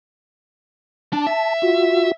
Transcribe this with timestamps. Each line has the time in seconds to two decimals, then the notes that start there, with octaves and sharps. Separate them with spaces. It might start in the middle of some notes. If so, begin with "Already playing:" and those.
1.13 D4 A5
1.27 E5
1.62 F4 F#4